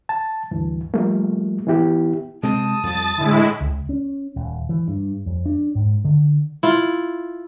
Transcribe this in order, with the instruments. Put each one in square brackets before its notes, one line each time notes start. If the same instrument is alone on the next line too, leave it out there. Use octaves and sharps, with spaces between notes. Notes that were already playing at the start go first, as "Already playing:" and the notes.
[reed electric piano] A5
D2 G2 E3
F3 G3 A3 A#3
E3 B3 E4 G4
[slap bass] C3 G#3 C4 [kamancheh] A5 D#6
[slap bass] F2 G3 [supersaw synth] A6
[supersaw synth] A2 G#3 E4 [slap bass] D3 D#3
[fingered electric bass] C#2
C#4
D#1
E3
G2
F2
D4
G#2
D3
[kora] E4 F4